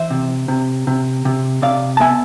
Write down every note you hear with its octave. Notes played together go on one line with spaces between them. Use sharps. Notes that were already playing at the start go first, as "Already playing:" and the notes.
Already playing: E3 C5 E5
C3
C3
C3
C3
C3 D5 F5
A5
B3 E5 G#5